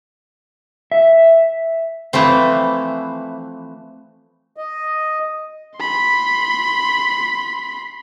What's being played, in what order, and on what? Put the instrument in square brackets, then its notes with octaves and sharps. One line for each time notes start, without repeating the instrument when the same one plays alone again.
[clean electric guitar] E5
[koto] E3 F3 A3 C4
[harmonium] D#5
[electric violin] B5 C6